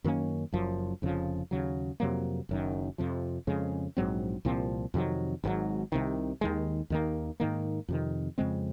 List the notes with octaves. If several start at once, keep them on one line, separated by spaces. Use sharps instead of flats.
F#2 D#3 A#3 C#4
F#1 F#2 F3
F1 F2 C#3 F3
D#2 C#3 F#3
F2 C3 F#3 A#3
F#1 F#2 D#3
F2 C3 F3
F2 C#3 G#3
A#1 G#2 F#3 C4
C2 A#2 F3 C4
F2 C3 D#3 F#3
G#1 G#2 D#3 F#3
C2 C3 D#3
D#2 D#3 G#3
D#2 D#3 A#3
G#2 D#3 A#3
F2 C3 D#3
F2 C#3 G#3 C4